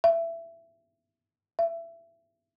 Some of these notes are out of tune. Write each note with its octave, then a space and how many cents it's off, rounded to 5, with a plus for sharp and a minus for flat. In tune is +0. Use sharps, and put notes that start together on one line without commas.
E5 +20
E5 +25